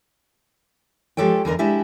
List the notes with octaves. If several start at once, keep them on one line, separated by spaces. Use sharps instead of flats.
F3 G#3 G4 A4 C#5 G5
E2 D3 A#4 D#5
G#3 D4 E4 G4 E5